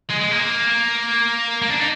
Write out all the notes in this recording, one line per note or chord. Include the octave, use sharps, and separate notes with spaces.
G#3
G#3
A#3
A#3
D4
D#4